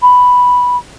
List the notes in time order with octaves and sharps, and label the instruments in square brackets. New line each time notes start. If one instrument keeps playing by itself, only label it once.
[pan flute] B5